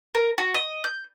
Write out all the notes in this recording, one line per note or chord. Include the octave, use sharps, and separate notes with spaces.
A#4
F#4
D#5
G6